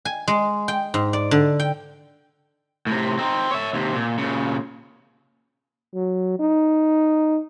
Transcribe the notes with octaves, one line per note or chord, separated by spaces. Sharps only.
G#5
G#3
G5
G#2
D5
D3
G5
A2 C3
C4 D#4
C#5 E5
D#2 C3
A#2
A#2 C#3
F#3
D#4